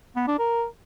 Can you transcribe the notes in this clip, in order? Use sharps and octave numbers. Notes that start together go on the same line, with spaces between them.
B3
D4
A#4